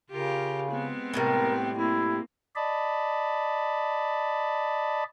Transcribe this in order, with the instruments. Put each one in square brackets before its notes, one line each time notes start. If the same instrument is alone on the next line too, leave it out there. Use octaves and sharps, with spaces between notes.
[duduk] C#3 [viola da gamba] F4 G4 A#4
[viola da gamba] G#3 B3 C4
[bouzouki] A2 C3 G3 [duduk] A#4
[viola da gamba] A#3 C4 [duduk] E4
[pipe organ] D5 D#5 A5 B5